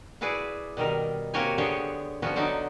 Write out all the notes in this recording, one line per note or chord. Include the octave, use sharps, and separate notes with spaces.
E4 F#4 G#4 B4 D5
B2 D#3 G3 A#4
C3 A#3 F#4 G4 C#5 G#5
D3 B3 G4 G#4 C5 C#5
F3 G3 B3 C#4 F#4
D3 F#3 B3 D#4 D5